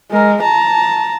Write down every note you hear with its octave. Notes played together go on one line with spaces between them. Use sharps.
G#3 A#4
A5 A#5